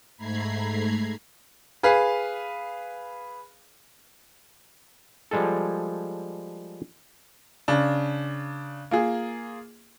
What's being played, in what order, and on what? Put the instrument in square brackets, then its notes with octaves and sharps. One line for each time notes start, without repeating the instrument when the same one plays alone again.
[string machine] G#2 A3 A#5 B5 G#6 C7
[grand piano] G#4 B4 F5
[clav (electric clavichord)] F3 G3 G#3 G#4 A4
[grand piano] C#3 D4
A#3 F4 G#4